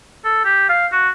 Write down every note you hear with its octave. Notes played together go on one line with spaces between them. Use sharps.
A4
G4
F5
F#4